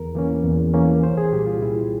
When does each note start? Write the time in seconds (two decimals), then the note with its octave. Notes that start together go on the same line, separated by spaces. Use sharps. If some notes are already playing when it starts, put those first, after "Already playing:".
Already playing: E2 A#4
0.15 E3 A#3 C#4
0.44 E2
0.74 E3 A#3 C#4
1.03 C2 C5
1.17 G#4
1.32 A#2 G3 G4
1.47 F4
1.61 C2 E4